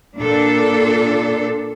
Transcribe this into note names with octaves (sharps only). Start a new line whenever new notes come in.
A#2 D4 A4